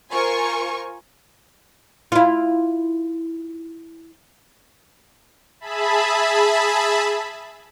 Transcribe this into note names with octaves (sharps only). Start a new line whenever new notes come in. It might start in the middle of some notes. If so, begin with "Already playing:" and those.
F4 A#4 C5 G#5 C#6
E4 F4
G#4 E5 A5 B5